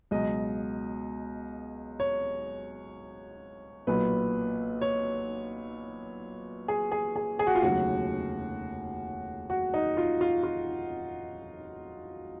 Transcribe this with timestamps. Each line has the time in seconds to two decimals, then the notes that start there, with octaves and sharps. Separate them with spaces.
0.11 C#2 B2 F#3 D#5
2.00 C#5
3.87 B1 A#2 F#3 B4
4.81 C#5
6.68 G#4
6.92 G#4
7.16 G#4
7.39 G#4
7.47 F#4
7.55 F4
7.62 F1 D#2 C#3 F#3 F#4
9.50 F#4
9.74 D#4
9.97 F4
10.21 F4
10.43 F4